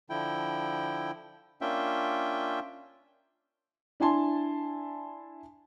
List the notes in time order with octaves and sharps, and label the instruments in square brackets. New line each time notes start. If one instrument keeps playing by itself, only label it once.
[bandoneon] D3 F3 E4 G5
A#3 C#4 D4 F4 E5 G5
[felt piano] D4 E4 G#5 A5 C6